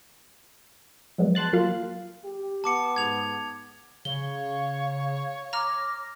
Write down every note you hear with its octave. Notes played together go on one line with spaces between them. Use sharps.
F3 F#3 G#3 B3
G5 A5 C6 F#6 A6
F#3 A#3 F4 F5
G4
B3 A5 D6 C#7
G#2 G#6 F7
C#3 C#5 F5 G7
A#5 D6 F6 A#6